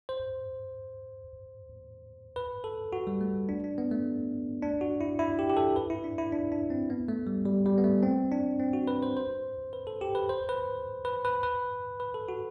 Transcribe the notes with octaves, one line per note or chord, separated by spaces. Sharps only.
C5
B4
A4
F#4
G3
A3
D4
D4
B3
A3
D4
F#4
E4
E4
G4
G4
A4
B4
E4
D4
E4
D4
D4
C4
B3
A3
G3
G3
G3
B3
A3
C4
D4
C4
F#4
B4
C5
C5
B4
A4
G4
B4
C5
B4
B4
B4
B4
B4
A4
F#4